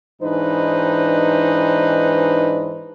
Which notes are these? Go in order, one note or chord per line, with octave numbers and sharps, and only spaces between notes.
G#2 E3 D4 D#4 B4 C5